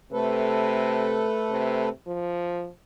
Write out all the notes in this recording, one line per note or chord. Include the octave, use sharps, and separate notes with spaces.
C3 A3 A4 B4
C3
F3